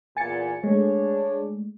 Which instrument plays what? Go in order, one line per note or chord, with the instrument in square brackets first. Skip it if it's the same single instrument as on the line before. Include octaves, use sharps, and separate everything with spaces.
[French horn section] E2 A#2 [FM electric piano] G#5 A6 C#7
[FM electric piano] G#3 A3 [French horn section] D4 G#4 C#5